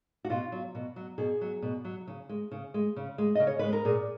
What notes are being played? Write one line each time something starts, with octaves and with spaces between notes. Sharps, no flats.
F#4
B2 F4
F#3
B2
F#3
B2 G#4
F#3
B2
F#3
C#3
G#3
C#3
G#3
C#3
G#3
C#3 D#5
C#5
G#3 B4
A#4
A#2 G#4